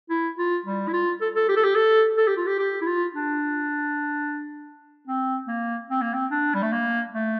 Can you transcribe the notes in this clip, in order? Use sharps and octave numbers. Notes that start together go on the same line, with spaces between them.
E4
F4
G3
E4
F4
A4
A4
G4
A4
G4
A4
A4
G4
F4
G4
G4
E4
F4
D4
C4
A#3
C4
A#3
C4
D4
G3
A3
A#3
A3